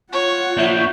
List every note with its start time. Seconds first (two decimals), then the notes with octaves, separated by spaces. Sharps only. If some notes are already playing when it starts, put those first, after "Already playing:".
0.12 F4 C#5 F#5
0.57 A#3 D4 E5 C#6 G6